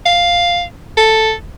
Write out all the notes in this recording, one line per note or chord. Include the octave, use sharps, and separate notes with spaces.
F5
A4